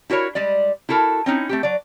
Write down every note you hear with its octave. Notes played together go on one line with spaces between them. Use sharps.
E4 F#4 A#4 C#5
G3 G#3 D5
E4 F#4 A4 A#4
C4 C#4 D#4 E4
A3 C4 G4
F#3 D5